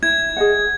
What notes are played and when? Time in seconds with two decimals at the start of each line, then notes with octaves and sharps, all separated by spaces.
0.02 E4 G#6
0.37 G#4 D#5 F#5